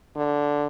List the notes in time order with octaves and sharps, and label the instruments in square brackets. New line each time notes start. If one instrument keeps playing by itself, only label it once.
[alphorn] D3